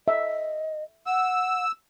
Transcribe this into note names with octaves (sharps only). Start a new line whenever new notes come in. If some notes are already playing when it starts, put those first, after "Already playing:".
D#5 E5
F#5 E6